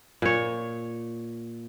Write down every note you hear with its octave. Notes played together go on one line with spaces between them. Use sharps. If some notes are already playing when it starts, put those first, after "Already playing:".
A#2 C#5